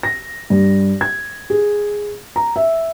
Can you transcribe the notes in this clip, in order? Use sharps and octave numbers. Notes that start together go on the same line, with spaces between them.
A#6
G2
G#6
G#4
A#5
E5